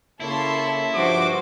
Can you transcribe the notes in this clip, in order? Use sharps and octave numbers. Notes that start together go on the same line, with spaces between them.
C#3 A#3 E4 A4 C#5 C6
G2 F3 F#4 C5 D6